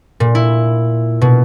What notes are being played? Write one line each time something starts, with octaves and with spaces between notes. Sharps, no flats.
A#2
E4
B2